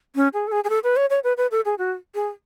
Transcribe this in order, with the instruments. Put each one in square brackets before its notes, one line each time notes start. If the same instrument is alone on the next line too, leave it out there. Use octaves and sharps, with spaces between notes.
[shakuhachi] C#4
G#4
A4
G#4
G#4
A4
B4
C#5
C#5
B4
B4
A4
G#4
F#4
G#4